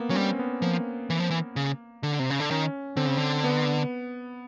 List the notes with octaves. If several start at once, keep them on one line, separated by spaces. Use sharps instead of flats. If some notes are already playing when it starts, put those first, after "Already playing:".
Already playing: A#3 B3
F#3 C#4
G3 C4
B3
F3 A#3
E3
F3
E3
C#3
D3
C3
C#3
D3
D#3 C#4
D3 C4
C#3
D3
B3